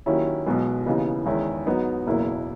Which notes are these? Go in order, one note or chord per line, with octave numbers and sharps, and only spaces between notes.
D#2 D#3 F#3 C#4 E4
B1 B2 G#3 B3
D#2 C#3 E3 B3 D#4
E2 D#3 G#3 C#4 E4
G#2 F#3 B3 D#4
F#1 E2 B2 A#3 E4